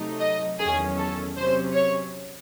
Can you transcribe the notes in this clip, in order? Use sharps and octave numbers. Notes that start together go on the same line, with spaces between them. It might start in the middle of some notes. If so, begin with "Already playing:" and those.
Already playing: C3 F#3 A3 D#4
D#5
E2 D#3 F#3 C#4 G#4
A4
C3 F#3 C#4 C5
C#5